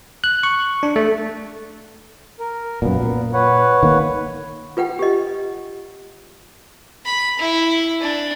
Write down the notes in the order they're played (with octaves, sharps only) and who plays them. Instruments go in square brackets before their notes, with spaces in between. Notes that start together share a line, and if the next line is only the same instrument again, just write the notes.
[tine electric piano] F#6
C#6
D4
A3
[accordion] A#4
[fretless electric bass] F#2 A#2 [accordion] B3
[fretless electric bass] A#2
[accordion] B4 C#5 F#5
[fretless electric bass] D#3 A#3
[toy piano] F4 B4 F#5 G5
G4 D#5
[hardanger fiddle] B5
E4
D4